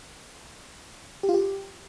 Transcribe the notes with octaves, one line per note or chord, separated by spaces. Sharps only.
G4
F4
G4